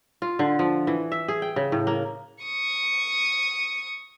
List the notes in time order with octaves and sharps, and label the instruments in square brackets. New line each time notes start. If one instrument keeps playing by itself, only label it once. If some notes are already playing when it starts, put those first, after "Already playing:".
[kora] F4
D3
F3
E3
E5
G#4
G5
C#3
A2
A#3
[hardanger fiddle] C#6 D#6